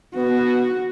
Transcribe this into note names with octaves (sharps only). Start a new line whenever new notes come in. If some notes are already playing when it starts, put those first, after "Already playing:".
B3 F#4